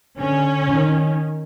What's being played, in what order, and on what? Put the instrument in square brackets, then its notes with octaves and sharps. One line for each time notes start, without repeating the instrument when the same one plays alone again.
[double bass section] D3 [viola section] C#4
[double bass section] D#3